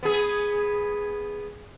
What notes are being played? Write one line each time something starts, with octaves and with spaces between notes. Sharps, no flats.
B3 G#4